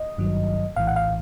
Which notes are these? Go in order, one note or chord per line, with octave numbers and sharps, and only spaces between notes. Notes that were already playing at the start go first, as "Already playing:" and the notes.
Already playing: D#5
G#1 G2 D#3 F#3
A#1 A2 E3 F5
F#5
F5